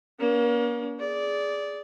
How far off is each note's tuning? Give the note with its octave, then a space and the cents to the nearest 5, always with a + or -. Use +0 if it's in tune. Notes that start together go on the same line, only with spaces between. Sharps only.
A#3 +40 C#4 +45
G#4 +0 D5 -15